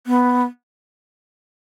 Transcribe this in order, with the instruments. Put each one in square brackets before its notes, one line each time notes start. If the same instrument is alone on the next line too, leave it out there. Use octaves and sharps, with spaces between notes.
[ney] B3